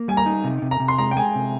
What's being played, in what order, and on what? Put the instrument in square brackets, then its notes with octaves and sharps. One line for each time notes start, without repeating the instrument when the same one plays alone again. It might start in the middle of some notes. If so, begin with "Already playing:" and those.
Already playing: [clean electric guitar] A#3
[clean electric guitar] G3 [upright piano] G#5
[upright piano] A#5
[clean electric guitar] D#4
C3
C3
[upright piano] A#5
[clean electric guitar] C3
[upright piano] C6
[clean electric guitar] G#3 [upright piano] A#5
[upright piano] G5
[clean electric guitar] G#3 [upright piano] G#5
[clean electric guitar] C3